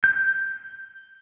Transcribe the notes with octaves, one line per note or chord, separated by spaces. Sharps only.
G6